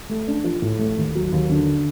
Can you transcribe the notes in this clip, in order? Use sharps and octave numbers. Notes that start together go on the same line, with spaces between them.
A3
D4
F3
A2
A3
D#2
F#3
D#2
D3